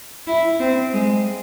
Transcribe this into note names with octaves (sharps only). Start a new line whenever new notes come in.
E4
C4
G#3